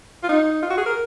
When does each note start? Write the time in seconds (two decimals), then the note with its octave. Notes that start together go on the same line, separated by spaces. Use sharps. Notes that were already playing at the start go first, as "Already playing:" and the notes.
0.23 F4
0.29 D#4
0.62 F4
0.70 F#4
0.77 G#4
0.86 A#4